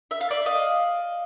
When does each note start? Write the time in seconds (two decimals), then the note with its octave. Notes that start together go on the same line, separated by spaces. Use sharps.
0.11 E5
0.21 F5
0.31 D5 E5
0.46 D#5 F5